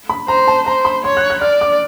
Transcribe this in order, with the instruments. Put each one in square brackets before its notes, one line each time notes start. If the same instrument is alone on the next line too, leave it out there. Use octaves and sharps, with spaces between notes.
[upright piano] B5
[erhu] C5 [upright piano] A#5
[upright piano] A5
[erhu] C5 [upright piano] A#5
[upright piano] B5
[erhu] C#5 [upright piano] C6
[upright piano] F#6
F#6
[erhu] D5 [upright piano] F6
[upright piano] D6